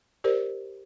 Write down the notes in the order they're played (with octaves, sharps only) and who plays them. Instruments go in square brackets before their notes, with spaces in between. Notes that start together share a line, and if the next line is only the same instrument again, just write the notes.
[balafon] G4 A#4 C5 D5